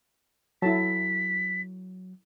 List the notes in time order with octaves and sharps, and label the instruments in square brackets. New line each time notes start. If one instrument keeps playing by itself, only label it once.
[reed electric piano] F#3 [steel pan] E4 A4 A5 [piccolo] B6